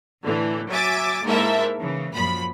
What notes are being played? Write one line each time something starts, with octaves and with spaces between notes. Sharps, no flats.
A2 D3 E3
F#3 E5 G#5 D6 A6
G#2 A#3 E4 A4 A#4 E5
C#3 E3
F#2 A#2 F3 B5